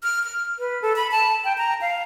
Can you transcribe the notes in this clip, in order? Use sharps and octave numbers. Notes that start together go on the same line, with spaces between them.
F6
F6
B4
A4
B5
A5
G5
A#5
F5